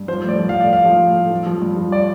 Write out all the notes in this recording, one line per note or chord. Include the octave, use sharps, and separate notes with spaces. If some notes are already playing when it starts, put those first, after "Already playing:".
Already playing: G2
F3 C5
A2
D5
F3
F5
A2
D5
A2 F5
F3
A2
A2
F3
F3
G2
F3
D5